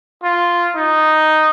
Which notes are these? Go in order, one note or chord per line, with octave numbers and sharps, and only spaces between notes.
F4
D#4